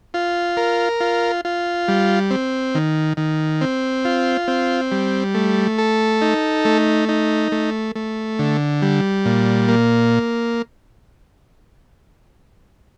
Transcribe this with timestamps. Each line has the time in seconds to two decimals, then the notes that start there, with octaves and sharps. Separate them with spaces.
0.14 F4
0.57 A#4
1.00 F4
1.45 F4
1.88 G3
2.31 C4
2.75 D#3
3.17 D#3
3.61 C4
4.05 F4
4.48 C4
4.92 G3
5.35 A3
5.78 A4
6.22 D#4
6.65 A3
7.09 D#4
7.52 A3
7.95 A3
8.39 D3
8.82 G3
9.25 A#2
9.68 A#3